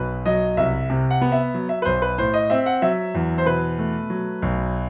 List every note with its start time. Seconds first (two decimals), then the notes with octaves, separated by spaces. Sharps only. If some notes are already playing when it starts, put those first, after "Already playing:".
Already playing: B1 B2 B4
0.26 F#3 D#5
0.57 C2 E5
0.90 C3
1.11 F#5
1.21 B3
1.32 E5
1.54 F#3
1.69 E5
1.82 B4
1.85 B1 C5
2.02 B4
2.18 A2 C5
2.34 D#5
2.50 C4 E5
2.66 F#5
2.82 F#3 E5
3.15 E2
3.38 C5
3.46 B2 B4
3.79 A3
4.10 F#3
4.42 B1